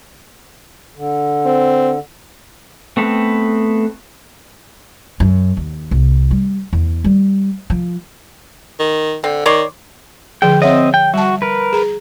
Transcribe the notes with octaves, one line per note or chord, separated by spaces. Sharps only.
D3
C4
A3 B3 C4 A4 B4
F#2
D#2
C2
G3
E2
G3
F3
D#3
D3 C4
D#3 C#5 D5 C6
D3 F3 G#4 G5
C4 C#5 D#5 E5 F#5
G5
G3 F#4 A5
A#4 B4
G#4 A#5